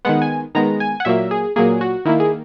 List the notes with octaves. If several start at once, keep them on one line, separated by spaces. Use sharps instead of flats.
D#3 G#3 B3 F#5
G#5
D#3 G#3 B3 A#5
G#5
F#5
A#2 F#3 A#3 E5
G#4
A#2 F#3 A#3 G#4
F#4
D#3 A#3 E4
G#4